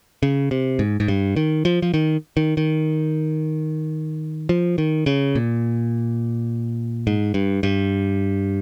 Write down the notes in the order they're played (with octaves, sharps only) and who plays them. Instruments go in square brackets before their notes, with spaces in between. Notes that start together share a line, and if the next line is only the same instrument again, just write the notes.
[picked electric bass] C#3
C3
G#2
G#2
G2
D#3
F3
F3
D#3
D#3
D#3
F3
D#3
C#3
A#2
G#2
G2
G2